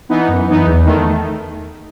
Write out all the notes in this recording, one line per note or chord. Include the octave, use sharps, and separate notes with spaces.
E3 B3 D#4
F#2
E3 B3 D#4
E2
D#3 A3